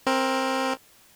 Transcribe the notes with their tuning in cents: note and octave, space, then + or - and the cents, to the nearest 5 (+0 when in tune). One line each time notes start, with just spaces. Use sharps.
C4 +15 A#4 +5